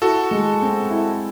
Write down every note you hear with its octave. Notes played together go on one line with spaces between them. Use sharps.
E4 F#4 A4
G#3
C4
E4